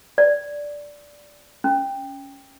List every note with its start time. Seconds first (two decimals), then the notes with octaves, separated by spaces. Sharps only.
0.18 D5
1.64 C#4